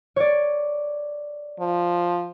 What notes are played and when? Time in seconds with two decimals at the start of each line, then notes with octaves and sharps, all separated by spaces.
0.16 C#5 D5
1.60 F3